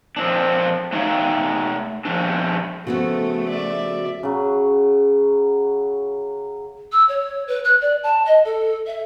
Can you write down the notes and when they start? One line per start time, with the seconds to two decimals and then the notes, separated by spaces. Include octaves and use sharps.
0.17 F3 C4 D4
0.93 A3 D4 D#4 C#5 F5 G5
2.05 F3 G3 D4
2.87 C#3 F3 A3 B3 F#4 A4
3.49 D5 E5
4.23 C#3 F#3
6.92 E6
7.08 C#5
7.47 B4
7.64 F#6
7.81 D5
8.03 A5
8.25 D#5
8.45 A4
8.86 E5